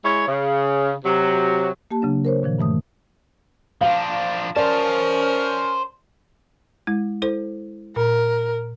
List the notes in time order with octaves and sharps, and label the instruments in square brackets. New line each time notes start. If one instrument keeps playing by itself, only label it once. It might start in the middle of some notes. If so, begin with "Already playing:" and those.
[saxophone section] G#3 E4 C#5
C#3
C3 F#3
[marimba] A#3 G4 A5
C#3 F#3 D4
A#4 C5 C#5
A#2 D#3 F3
G2 E3 A3 D#6
[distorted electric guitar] F3 D4 [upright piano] F5
[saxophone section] C#4 A#4 [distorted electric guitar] C5 A5 [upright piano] D5
[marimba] G#3 E4
E4 A4 C5
[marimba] A#2 [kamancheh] A#4